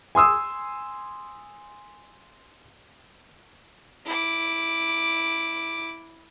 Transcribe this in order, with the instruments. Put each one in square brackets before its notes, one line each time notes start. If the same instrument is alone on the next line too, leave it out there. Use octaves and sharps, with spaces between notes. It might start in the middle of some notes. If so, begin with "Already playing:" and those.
[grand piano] G#5 C6 D#6 E6
[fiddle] E4 D6